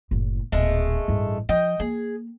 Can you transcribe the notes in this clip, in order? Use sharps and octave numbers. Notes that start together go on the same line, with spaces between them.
F#1 A2
D1 A#2 G#3 A3
A1 G2
F3 D#5 G5
A#3 G#4